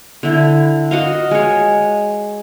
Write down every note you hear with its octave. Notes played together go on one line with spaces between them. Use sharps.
D3 E4
F#4 D#5 F5
G#3 C#5